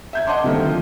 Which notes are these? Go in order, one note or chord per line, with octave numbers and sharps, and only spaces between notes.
E5 G6 G#6
D#5 F#5 A5 C6 D6
D3 D#3 G3 A3 A#3 C4
F3